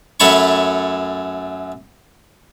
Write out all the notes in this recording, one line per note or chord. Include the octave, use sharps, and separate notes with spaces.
F#2 A3 C#5 A5 B5 C#6